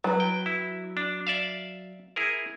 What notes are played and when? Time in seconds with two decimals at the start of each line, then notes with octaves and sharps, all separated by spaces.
0.04 F#3 B4
0.20 G5
0.46 E4
0.97 D4
1.27 D5 E5 F5
2.16 E4 G#4 A#4